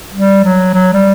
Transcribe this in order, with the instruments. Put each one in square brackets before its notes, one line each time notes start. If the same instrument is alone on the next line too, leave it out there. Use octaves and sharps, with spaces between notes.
[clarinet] G3
F#3
F#3
G3